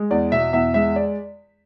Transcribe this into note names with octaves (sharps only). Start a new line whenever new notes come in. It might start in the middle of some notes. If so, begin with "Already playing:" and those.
Already playing: G#3
E2 D5
B2 E5
E2 E5
G#3 E5
D5